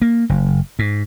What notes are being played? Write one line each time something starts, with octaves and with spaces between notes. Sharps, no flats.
A#3
F#1
G#2